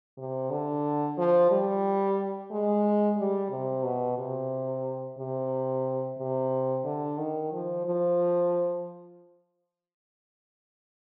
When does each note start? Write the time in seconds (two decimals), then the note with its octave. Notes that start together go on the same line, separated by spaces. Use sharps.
0.18 C3
0.51 D3
1.18 F3
1.51 G3
2.51 G#3
3.17 G3
3.51 C3
3.84 B2
4.19 C3
5.18 C3
6.19 C3
6.85 D3
7.18 D#3
7.53 F3
7.86 F3